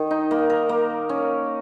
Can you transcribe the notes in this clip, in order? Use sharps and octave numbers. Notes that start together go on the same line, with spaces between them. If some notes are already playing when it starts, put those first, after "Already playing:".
Already playing: D#3
D#4
A#3
A#4
A#3
C#4